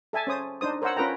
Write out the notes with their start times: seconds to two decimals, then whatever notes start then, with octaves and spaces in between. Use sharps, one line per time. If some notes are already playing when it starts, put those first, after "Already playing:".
0.13 A4 E5 G#5 A5
0.27 C#4 C5 D#6
0.61 D4 D#4 C5 D#6
0.82 A#4 C5 C#5 F#5 E6
0.96 C#4 F4 A#4 B4 G5 A#5